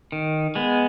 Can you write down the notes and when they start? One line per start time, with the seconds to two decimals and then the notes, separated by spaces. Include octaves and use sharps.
0.12 D#3
0.55 G#3 B3